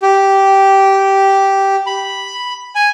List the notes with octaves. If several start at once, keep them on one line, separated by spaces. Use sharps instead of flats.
G4
B5
G#5